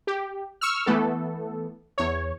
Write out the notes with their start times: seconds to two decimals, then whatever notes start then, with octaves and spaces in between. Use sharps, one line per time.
0.07 G4
0.61 C#6 E6 F6
0.86 E3 A3 B3 A4
1.98 E2 C#5